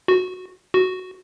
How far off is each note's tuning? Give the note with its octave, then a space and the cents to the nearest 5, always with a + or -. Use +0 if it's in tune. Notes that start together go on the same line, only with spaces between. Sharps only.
F#4 -10
F#4 +0